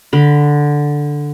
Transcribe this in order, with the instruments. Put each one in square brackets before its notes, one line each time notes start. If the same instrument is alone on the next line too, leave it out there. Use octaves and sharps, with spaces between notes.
[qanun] D3 B5